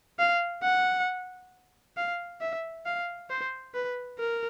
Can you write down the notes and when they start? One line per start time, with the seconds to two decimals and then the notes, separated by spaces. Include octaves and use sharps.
0.19 F5
0.63 F#5
1.97 F5
2.41 E5
2.86 F5
3.30 C5
3.75 B4
4.19 A#4